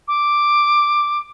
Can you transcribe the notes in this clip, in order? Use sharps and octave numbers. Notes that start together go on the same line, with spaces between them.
D6